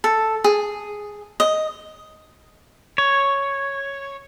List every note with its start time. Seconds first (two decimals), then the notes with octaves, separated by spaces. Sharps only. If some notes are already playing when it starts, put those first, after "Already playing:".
0.04 A4
0.44 G#4
1.40 D#5
2.98 C#5